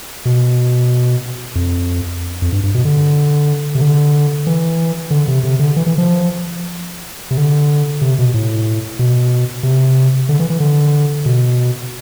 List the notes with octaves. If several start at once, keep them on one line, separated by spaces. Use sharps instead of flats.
B2
F2
F2
G2
G2
B2
D3
C3
D3
E3
D3
C3
C3
D3
E3
E3
F3
C3
D3
C3
B2
A2
B2
C3
D3
E3
E3
D3
B2